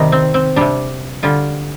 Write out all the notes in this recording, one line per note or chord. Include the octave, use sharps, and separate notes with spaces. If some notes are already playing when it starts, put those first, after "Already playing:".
Already playing: C3 D#3 G3 D#4
C4
C4
C3 G3 D4
D3 G3 F4